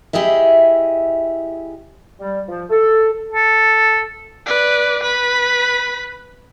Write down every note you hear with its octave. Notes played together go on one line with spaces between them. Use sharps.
E4 G4 G#4 D#5 E5
G3
F3
A4
A4
B4 D5
B4 B5